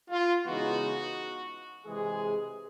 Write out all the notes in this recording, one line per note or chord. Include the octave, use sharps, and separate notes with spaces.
F4
C#3 E3 G#3 B3 D#4 F#4
C3 E3 G#3 G#4